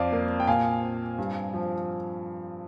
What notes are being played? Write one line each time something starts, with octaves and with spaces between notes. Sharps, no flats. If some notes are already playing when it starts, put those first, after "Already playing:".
Already playing: F2 D5 F5
A#3
G5
A#2 F5 G#5
C4
G2
F3